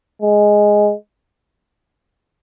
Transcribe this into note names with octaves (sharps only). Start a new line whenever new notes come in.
G#3